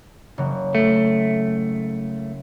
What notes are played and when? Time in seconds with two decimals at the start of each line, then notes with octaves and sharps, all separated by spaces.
0.38 F#1 F#3
0.75 A3